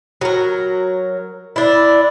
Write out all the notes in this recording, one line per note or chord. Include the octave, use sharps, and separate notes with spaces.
F#3 A#4
D4 E4